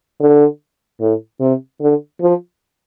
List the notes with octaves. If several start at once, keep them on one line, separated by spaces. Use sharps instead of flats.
D3
A2
C3
D3
F3